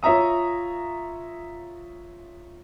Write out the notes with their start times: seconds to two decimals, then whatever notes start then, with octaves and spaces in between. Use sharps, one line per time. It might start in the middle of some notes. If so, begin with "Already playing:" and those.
0.03 F4 C#5 E5 A#5 D#6